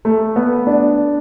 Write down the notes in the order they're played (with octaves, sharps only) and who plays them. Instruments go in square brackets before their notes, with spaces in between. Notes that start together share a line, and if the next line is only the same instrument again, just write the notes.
[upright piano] A3
B3
D4